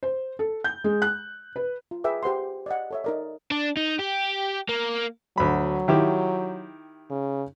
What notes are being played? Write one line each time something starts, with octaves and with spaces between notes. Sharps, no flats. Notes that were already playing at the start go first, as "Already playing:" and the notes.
C5
A4
G6
G#3
F#6
B4
F4
G#4 B4 E5 G5 D6
G4 C5 F#5 C6
D5 D#5 F#5
A4 C#5 E5
D#4 A#4 D5
D4
D#4
G4
A#3
D2 F#3 B5
D#3 E4 G4
C#3